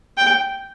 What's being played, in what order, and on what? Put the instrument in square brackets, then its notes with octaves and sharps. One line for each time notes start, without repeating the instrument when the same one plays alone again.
[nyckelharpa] G5